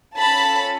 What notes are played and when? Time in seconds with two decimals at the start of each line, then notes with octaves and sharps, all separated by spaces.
0.17 C#4 F4 A4 A5 B5